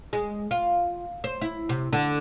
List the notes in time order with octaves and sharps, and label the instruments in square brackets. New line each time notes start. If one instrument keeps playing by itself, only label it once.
[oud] G#3
F4
C5
E4
C3
D3